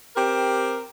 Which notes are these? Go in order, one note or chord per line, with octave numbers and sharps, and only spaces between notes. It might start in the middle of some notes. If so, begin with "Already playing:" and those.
C4 G4 A#4